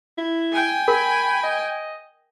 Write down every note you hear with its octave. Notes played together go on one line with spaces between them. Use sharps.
E4
G5 G#5
A#4 B5
D#5